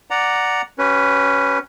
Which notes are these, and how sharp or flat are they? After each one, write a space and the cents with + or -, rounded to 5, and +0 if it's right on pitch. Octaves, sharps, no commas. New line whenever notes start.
D5 +0 F#5 +0 A#5 +0
C#4 +0 G4 -45 B4 +0